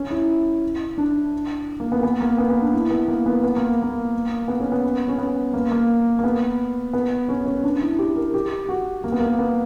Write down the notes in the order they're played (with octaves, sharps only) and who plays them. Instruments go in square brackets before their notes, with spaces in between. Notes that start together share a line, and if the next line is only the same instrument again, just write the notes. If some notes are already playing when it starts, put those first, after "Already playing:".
Already playing: [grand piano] C#4
E4
D4
A#3
B3
B3
A#3
B3
B3
D4
E4
B3
A#3
B3
B3
A#3
A#3
B3
C#4
B3
C#4
B3
A#3
A#3
A#3
B3
B3
C#4
C#4
D4
E4
G4
A#4
G4
F#4
A#3
B3
A#3
B3